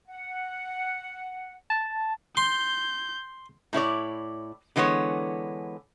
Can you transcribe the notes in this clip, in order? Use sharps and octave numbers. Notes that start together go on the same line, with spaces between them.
F#5
A5
C6 G6
A2 E4 C#5 D5
D3 E3 G#3 B3 C#5